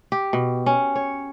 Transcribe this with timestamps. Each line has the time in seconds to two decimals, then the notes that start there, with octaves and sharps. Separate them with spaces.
0.12 G4
0.33 B2
0.66 C#4
0.95 C#5